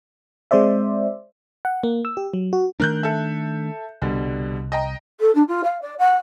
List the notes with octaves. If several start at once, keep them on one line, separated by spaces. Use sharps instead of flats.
G#3 C4 C5 D5 E5
F#5
A#3
E6
G4
F#3
F#4
D#3 A3 D4 A#4 F#6 G6
A4 E5
C2 B2 D3 G3
D#5 G5 A#5
A4
D4
F4
F5
D5
F#5